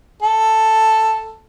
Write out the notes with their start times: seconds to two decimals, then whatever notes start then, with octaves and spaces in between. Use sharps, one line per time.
0.22 A4